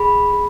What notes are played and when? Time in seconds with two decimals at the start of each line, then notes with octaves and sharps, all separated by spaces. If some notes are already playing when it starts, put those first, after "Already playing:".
Already playing: G#4 B5
0.33 G#4